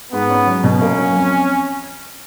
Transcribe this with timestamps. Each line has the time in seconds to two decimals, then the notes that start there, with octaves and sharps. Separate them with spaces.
0.12 G#2 B3
0.30 C#4
0.47 F#3
0.64 B2 C#4
0.81 A#3
0.98 F#3
1.16 F2